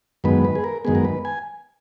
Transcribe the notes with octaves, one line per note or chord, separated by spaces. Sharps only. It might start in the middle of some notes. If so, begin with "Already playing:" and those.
F#2 D#3 G#3 B3 B4
B4
G#4
A#4
F#2 D#3 G#3 B3 G#4
A#4
B4
G#5